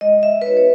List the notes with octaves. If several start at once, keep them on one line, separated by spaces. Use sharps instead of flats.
G#3 D#5
E5
B4
B3 D#4 F#4 C#5
C#5